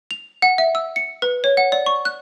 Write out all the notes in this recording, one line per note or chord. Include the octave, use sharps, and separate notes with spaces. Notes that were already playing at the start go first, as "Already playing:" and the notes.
F7
F#5
E5
E6
C#7
B4
C#5
F#5
D5
C#6
F#6